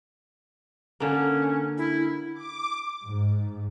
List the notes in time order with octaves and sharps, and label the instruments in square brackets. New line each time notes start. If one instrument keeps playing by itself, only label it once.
[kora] D3 A#3 [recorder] C#4
[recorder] E4
[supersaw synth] D6
[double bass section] G#2